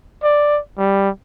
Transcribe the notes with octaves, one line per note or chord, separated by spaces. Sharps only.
D5
G3